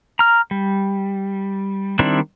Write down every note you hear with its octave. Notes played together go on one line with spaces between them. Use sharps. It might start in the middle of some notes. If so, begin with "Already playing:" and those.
A#5 F6
G3
D#3 G3 C4 D4 E4